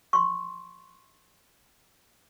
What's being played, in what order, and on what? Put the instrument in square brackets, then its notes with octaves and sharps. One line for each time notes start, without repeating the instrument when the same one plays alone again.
[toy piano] C6 C#6